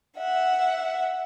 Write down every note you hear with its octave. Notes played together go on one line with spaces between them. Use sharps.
E5 F#5